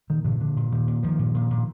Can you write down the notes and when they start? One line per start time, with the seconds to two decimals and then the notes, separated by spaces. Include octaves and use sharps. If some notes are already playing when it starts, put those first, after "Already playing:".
0.10 A#2 D#3
0.24 A#2 D3 E3
0.40 A#2 D3
0.57 A#2
0.72 A#2 D#3
0.87 A#2
1.03 A#2 D#3 F3
1.19 A#2
1.34 A#2
1.50 A#2